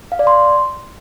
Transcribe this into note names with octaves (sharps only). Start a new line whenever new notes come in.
F5
D5
C6